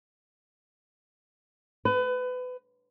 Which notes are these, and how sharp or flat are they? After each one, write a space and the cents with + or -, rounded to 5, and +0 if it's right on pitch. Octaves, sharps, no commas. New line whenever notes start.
B4 +30